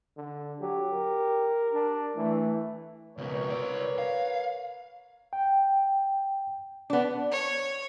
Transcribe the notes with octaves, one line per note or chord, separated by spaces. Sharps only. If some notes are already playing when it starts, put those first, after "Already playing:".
D3
F#3 G4
A#4
D4
E3 A3
C#2 B2 A#4 B4 C#5
C2 D5
F5
G5
B3 D4
C#5